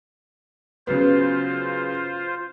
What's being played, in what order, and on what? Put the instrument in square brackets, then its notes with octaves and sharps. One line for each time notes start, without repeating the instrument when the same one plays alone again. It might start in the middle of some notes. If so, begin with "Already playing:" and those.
[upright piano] C#3 F#3 B3 [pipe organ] F4 C5